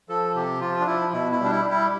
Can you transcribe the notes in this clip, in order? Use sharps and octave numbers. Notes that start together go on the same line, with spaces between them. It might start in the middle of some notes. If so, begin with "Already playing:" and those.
F3 A4
C3 G4
F3 F4
D4
F3 E4
B2 E4
E4
G3
D4
E4
G3
E4